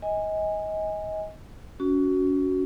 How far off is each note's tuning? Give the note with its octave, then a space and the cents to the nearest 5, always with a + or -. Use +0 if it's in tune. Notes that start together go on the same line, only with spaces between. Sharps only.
D#5 +25 G#5 -15
C#4 +30 F#4 +0